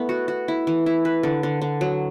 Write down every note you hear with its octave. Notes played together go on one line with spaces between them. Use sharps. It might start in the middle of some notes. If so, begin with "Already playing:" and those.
Already playing: A3 B3 E4
F#4
F#4
E4
E3
E4
B4
D3
D3
D3
F#3